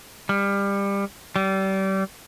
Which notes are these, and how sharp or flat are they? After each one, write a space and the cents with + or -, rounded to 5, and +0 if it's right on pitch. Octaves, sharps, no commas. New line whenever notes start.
G3 +25
G3 -30